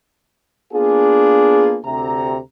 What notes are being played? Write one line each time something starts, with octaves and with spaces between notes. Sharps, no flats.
A#3 B3 D4 F4 G#4
D2 C3 A#5